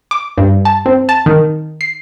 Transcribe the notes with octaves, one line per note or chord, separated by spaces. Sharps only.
D6
G2
A5
C4
A5
D#3
C7